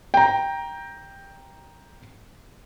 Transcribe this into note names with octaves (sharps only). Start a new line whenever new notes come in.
G5 A#5